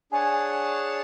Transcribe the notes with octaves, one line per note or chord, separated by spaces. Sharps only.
D4 G#4 C#5 F#5 G#5 A5